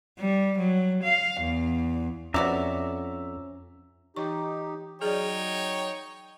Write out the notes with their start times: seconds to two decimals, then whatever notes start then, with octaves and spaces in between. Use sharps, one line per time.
0.19 G3
0.58 F#3
1.03 F5
1.41 E2
2.34 F2 B3 C#4 F#4 D5 E5 A#5
4.16 E3 D#4 G4 C#6
5.01 F#3 D#4 G#4 C#5 D5 G5